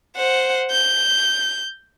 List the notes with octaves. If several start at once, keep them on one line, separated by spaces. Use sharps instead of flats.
C5 F#5
G6